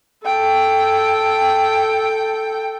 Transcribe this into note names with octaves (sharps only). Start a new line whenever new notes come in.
A4 G5